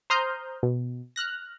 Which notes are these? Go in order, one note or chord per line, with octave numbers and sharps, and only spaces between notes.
C5 A#5 C6 D#6 F6 G6
B2
F6 F#6 A#6